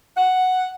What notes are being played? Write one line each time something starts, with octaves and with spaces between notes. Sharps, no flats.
F#5